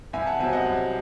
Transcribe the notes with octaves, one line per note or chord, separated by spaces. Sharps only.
C2 E5 G#5
F#5 A5
C3 F#3 C4 E5 G#5
D#5 F#5
C2